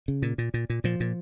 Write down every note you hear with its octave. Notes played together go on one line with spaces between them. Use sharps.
C#3
A#2
A#2
A#2
A#2
A#2 F3
A#2